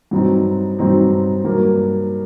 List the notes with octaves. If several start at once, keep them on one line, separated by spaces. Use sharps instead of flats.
G2 F#3 C4 D#4
G2 F#3 C4 D#4
G2 F#3 A#3